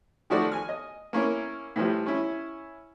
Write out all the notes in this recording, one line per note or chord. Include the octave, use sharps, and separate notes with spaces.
D#3 F3 A3 F#4 D5
G#5 F6
D#5
A#3 C#4 E4 A#4
A2 E3 F3 G3
C#4 E4